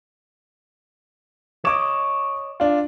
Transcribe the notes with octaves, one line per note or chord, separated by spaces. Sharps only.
C#5 D#5 D6 E7
D4 F4